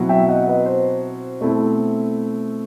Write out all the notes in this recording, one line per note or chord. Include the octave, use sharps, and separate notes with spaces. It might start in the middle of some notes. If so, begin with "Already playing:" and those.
Already playing: B2 F#3 C4 E4
E5 G5
D#5 F#5
B4 D#5
C5
B2 A3 C4 E4